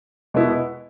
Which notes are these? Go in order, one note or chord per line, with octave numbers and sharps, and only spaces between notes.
B2 G#3 B3 E4